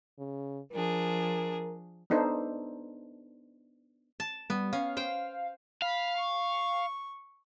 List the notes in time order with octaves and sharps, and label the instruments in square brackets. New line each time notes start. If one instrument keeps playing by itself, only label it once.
[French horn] C#3
[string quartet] F3 D4 G#4 [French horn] A#4
[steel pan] B3 D4 D#4 A4 C5
[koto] A5
[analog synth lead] G3 [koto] B3
[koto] C#4 [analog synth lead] F5
[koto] C5 G5
[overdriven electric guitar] F5 [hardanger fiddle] B5
[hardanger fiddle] C#6